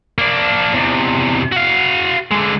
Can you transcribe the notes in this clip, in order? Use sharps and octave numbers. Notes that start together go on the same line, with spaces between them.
A#3 D4
E2 C3
F#4 F5
D3 G#3